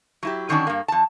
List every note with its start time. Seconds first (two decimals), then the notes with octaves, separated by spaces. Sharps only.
0.23 F#3 E4 G4
0.49 D3 D#3 F#3 C#4 D4
0.67 G2 A#3
0.88 F2 A5